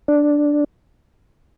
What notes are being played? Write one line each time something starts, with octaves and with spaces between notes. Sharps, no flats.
D4